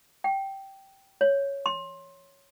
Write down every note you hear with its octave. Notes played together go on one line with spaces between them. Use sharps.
G5
C#5
C6